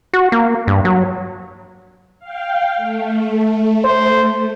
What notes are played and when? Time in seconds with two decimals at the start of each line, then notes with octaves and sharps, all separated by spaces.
0.13 F#4
0.32 A#3
0.67 G2
0.85 F#3
2.19 F5 G5
2.77 A3
3.85 C5